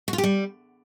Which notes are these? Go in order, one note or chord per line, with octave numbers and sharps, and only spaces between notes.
F#4
F4
G4
G3